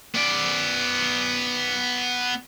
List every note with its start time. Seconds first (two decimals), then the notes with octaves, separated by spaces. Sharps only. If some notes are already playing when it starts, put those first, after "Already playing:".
0.15 B3 D5